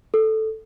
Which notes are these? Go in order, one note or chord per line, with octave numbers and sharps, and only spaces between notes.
A4